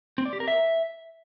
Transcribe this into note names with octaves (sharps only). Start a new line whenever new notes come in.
C4
D5
G4
A#4
E5